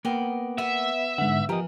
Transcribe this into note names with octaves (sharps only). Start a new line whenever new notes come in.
A#3 B3 A#4 G5
B3 E5
G#2 D3 F#5
E3 F3 G4 A#4 D#5